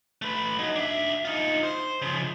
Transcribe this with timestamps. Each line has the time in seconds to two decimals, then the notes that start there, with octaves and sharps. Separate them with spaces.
0.22 A3 B4
0.59 F#3 D#4
0.76 D4 E5
1.25 D#4 F4
1.63 C5
2.02 C#3 F3